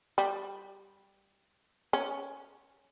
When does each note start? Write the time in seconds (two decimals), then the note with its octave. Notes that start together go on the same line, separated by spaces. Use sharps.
0.18 G3
1.93 C#4